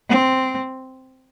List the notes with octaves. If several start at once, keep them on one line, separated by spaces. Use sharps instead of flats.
C4